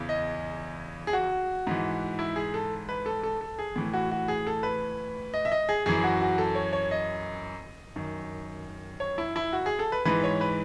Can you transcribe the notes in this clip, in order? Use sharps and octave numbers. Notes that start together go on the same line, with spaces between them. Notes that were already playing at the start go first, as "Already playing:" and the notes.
Already playing: E2 C#3 E3
D#5
G#4
F#4
G#2 E3
E4
G#4
A4
B4
A4
A4
A4
G#4
A2 E3
F#4
F#4
G#4
A4
B4
D#5
E5
D#5
G#4
F#2 E3 G#4
F#4
F#4
A4
C#5
C#5
D#5
F#2 D#3
C#5
E4
E4
F#4
G#4
A4
B4
G#2 E3 B4
C#5
B4